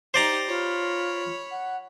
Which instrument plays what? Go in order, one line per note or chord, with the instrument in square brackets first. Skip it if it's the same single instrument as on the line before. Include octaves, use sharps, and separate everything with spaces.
[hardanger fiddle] D#4 G4 [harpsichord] C5 D5 A#5
[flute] F4 [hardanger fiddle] C#5 B5
[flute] F#5